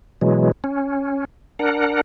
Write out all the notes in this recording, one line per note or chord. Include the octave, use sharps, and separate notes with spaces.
B2 E3 F#3 G#3
C#4
D4 A#4 F#5